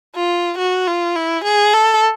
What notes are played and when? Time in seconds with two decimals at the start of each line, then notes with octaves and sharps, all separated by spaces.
0.15 F4
0.58 F#4
0.87 F4
1.16 E4
1.44 G#4
1.73 A4